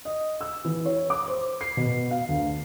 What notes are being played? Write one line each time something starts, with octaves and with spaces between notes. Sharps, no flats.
D#5
E6
E3
C#5
D6
C5
C7
B2
F5
D2